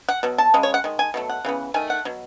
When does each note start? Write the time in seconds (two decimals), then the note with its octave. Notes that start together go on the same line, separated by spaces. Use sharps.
0.09 F#5
0.23 B2 F#3
0.38 A5
0.54 C#3 G#3
0.63 C#5
0.74 F#5
0.84 D#3 G#3
0.99 G#5
1.14 B2 F#3 A3
1.30 F#5
1.45 C#3 E3 B3
1.74 D#3 A3 G#5
1.90 F#5
2.05 B2 F#3